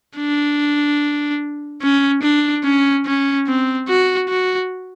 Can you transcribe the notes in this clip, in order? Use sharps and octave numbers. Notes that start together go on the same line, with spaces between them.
D4
C#4
D4
C#4
C#4
C4
F#4
F#4